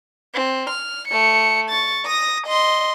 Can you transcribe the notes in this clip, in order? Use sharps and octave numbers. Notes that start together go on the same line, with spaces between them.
C4
F6
A3 C#7
C#6 A6
D#6 A#6
D#5 C6